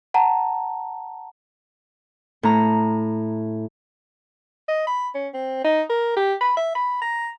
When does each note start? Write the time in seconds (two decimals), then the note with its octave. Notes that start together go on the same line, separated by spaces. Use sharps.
0.14 F#5 A5 A#5
2.43 A2 A#5
4.68 D#5
4.87 B5
5.14 C#4
5.34 C4
5.64 D#4
5.89 A#4
6.17 G4
6.41 B5
6.57 E5
6.75 B5
7.02 A#5